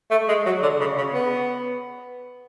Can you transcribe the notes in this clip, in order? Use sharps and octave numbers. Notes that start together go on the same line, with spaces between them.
A3
G#3
F#3
D3
C#3
C#3
B3